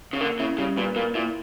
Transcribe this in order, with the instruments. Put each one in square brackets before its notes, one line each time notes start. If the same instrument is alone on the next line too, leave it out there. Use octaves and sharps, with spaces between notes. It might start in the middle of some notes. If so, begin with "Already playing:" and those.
[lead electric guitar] C#3
[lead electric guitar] D3 [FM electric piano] A#3
[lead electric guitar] C#3 [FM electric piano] E4
[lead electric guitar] C#3 [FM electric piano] G3
[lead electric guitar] A#2 [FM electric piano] B4
[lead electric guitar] A#2 [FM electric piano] A#3
[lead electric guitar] A#2 [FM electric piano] E4